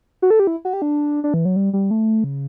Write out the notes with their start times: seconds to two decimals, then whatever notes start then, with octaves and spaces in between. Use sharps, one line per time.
0.22 F#4
0.30 A4
0.40 G4
0.47 E4
0.65 F#4
0.73 G4
0.82 D4
1.24 D4
1.34 E3
1.45 F#3
1.56 G3
1.73 G3
1.91 A3
2.24 C#3